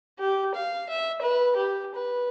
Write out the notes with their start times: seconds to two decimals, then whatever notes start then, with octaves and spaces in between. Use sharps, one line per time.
0.19 G4
0.55 F5
0.89 E5
1.22 B4
1.56 G4
1.95 B4